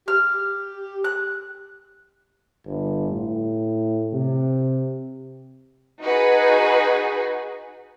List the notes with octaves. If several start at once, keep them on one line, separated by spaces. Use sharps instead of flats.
G4 F6
F#6
G1
A2
C3
D#4 F#4 G#4 B4